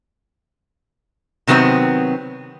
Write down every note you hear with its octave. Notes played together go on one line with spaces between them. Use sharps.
C3 D#3 F#3 B3 C4